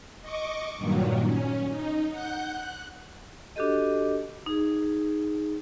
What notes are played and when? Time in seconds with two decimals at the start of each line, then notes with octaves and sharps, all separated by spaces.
0.22 D#5 C#6 D6
0.77 G2 A#2 D#3 F#3
1.24 C#4
1.70 D#4
2.11 F#5 F#6 G6
2.52 F#6
3.56 D4 F#4 G4 A4 D#5
4.46 D#4 G#4